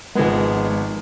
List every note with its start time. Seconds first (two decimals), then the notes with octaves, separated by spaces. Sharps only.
0.15 G#1 F3 G#3 B3